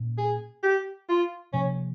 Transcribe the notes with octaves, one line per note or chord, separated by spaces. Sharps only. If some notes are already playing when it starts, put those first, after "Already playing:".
Already playing: A#2 A#3 C#4
G#4
G4
F4
C3 F3 A#3 C#4